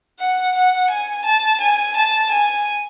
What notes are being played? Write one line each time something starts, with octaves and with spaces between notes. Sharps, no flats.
F#5
F#5
G#5
A5
G#5
A5
G#5